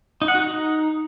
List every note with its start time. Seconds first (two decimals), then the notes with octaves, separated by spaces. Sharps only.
0.22 D#4
0.28 F#5
0.35 F#4
0.42 D#4